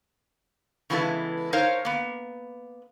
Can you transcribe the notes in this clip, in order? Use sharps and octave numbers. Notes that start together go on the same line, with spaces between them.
C#3 E3 G#3 B3 E4 A4
D#4 A4 A#4 C5 C#5 F5
A#3 B3